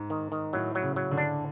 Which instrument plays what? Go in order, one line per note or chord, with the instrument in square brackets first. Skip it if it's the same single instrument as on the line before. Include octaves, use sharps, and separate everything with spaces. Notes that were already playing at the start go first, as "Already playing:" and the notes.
Already playing: [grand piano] G#2
[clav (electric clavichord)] D#3
D#3
[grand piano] A2 [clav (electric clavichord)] F#3
[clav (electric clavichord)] F#3
[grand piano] C#3
[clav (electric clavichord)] F#3
[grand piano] D3
[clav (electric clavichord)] D4